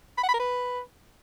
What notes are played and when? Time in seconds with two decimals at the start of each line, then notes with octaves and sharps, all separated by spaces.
0.17 B5
0.23 F#5
0.28 B5
0.34 A#4
0.39 B4